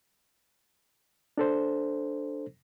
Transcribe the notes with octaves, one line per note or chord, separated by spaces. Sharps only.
D4 A4 C5